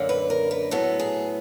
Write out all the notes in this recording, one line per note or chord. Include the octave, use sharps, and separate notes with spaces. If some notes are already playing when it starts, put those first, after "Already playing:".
Already playing: F#2 D3 A#3
B4
A#4
B4
A2 F#3 B3 A4
G#4